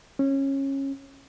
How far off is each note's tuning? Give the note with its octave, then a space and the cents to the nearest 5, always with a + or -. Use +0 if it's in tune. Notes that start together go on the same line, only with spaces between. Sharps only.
C#4 -20